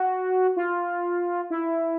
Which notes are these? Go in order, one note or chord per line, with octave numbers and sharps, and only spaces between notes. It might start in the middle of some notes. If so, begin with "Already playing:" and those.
Already playing: F#4
F4
E4